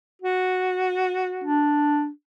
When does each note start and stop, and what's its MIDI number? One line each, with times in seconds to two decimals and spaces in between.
0.22 1.74 66
1.44 2.09 62